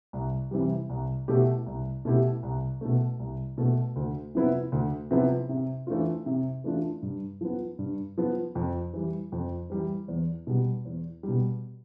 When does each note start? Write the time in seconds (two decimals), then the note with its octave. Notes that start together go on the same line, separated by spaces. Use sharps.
0.13 C2
0.51 C3 E3 G3
0.90 C2
1.28 B2 A3 E4 G4
1.66 C2
2.05 B2 A3 E4 G4
2.43 C2
2.81 B2 A3
3.20 C2
3.58 B2 A3
3.96 D2
4.35 C3 F3 B3 E4
4.72 D2
5.11 C3 F3 B3 E4
5.49 C3
5.87 E3 A3 D4 F4
6.26 C3
6.64 E3 A3 D4 F4
7.02 G2
7.41 F3 B3
7.79 G2
8.18 F3 B3
8.55 F2
8.93 E3 G3
9.32 F2
9.70 E3 G3
10.08 E2
10.47 B2 G3
10.85 E2
11.23 B2 G3